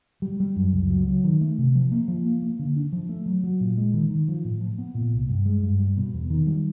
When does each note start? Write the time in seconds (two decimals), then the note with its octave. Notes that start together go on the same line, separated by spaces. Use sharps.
0.22 G3
0.40 G3
0.56 F#2
0.73 C#2
0.90 F#3
1.08 F#3
1.24 D#3
1.41 A3
1.58 C3
1.75 F3
1.92 A#3
2.08 F3
2.25 A#3
2.42 A#3
2.59 D3
2.76 D4
2.92 F3
3.09 A3
3.26 F#3
3.43 F#3
3.60 A#2
3.77 G#3
3.93 D#3
4.10 D#3
4.28 F3
4.45 A2
4.61 F3
4.78 B3
4.95 A#2
5.12 C2
5.29 G2
5.46 G#3
5.63 G2
5.79 G3
5.97 B2
6.14 E2
6.30 D#3
6.47 G3